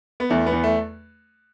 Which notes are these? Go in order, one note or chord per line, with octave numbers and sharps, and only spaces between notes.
B3
E2 A3
B3
E2
A3